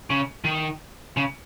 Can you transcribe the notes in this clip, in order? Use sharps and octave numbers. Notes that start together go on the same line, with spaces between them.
C#3
D#3
C#3